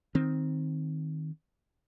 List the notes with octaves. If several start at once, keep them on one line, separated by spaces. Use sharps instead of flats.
D#3 C4